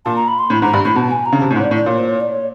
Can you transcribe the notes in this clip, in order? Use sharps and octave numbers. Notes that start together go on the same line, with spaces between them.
A#2 A5
A#5
B5
C6
A2 B5
G#2 A#5
G2 B5
A2 B5
B2 A5
G#5
A#5
C#3
C3 A5
A2
G#2
C#5
D5
A2
D5
A#2 C#5
C5
C#5
D5
C#5